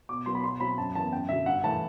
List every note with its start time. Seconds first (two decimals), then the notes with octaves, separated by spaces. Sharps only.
0.09 B2 D6
0.26 F#3 B3 C6
0.35 B5
0.43 B2 C6
0.60 F#3 C4 B5
0.77 F#2 A5
0.95 E3 B3 A5
1.12 F#2 G5
1.29 D3 F#3 E5
1.46 G2 F#5
1.64 E3 A3 A5